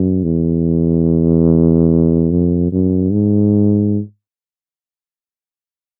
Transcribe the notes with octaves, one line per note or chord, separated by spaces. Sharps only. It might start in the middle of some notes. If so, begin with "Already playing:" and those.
Already playing: F#2
E2
F2
F#2
G#2